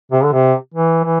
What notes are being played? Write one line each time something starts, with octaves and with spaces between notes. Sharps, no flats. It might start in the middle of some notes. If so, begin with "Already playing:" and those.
C3
D3
C3
E3
E3